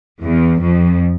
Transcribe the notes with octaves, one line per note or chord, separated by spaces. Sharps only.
E2
F2